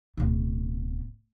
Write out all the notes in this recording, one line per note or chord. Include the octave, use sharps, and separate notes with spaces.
D1 B2